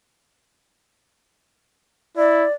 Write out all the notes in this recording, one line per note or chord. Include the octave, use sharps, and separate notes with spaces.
E4 D5